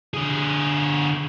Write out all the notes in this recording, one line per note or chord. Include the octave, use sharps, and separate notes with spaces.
D3 G#4